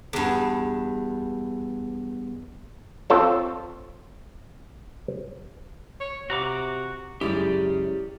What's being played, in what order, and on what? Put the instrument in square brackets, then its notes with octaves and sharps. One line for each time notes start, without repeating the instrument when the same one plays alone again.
[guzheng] E2 G2
[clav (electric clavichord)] C4 F4 A4 C#5
[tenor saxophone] C#5
[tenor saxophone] C3 [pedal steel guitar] F#4 A#5 D6
[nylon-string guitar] F#2 G#3 E4 [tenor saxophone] C#3 [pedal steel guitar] G4 D5